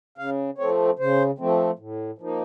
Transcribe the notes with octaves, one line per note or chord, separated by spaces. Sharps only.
C#3 F5
F3 A3 C4 C#5
C#3 C5
F3 A3 C4
A2
F3 A#3 D#4